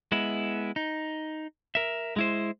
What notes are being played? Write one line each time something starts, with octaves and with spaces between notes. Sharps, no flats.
G#3 B3 E4
D#4
A#4 E5
G#3 E4 C5